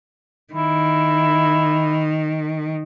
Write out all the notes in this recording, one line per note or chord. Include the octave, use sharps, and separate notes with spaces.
D#3 E4